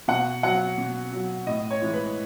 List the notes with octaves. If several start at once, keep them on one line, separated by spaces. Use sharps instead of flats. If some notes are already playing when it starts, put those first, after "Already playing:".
B2 F#5
F#3 F#5
B2
F#3
A2 D#5
C#5
E3 G#3
B4